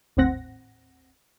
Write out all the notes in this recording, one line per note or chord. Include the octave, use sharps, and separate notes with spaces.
G#1 D#2 A2 C4 F#5 A#6